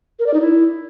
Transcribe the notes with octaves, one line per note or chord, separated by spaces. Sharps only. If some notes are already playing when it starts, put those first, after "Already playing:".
A#4
D5
D#4
E4